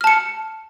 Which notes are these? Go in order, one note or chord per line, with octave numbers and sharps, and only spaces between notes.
A5 F6 C#7